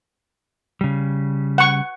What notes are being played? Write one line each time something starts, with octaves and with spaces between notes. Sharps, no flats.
C#3 G3
F#5 C#6